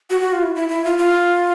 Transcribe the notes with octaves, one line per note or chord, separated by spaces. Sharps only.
F#4
F#4
F4
E4
E4
E4
F4
F4